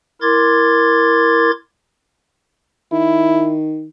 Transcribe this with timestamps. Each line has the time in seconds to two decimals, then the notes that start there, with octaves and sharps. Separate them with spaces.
0.22 E4 A#4 C6 D6 G#6 A6
2.92 D#3 E4